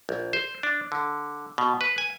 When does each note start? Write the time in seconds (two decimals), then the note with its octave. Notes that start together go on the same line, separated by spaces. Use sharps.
0.09 A#1
0.33 C5
0.63 D4
0.92 D3
1.58 B2
1.81 B4
1.98 G#5